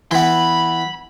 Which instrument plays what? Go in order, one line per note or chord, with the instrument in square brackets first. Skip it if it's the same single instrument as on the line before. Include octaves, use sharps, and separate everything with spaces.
[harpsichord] E3 B3 [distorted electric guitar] B5 C6